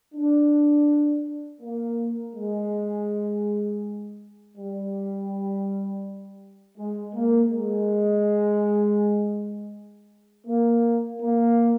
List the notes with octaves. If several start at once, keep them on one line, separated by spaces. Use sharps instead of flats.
D4
A#3
G#3
G3
G#3
A#3
G#3
A#3
A#3